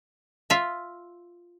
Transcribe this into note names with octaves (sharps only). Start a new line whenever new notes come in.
F4 E5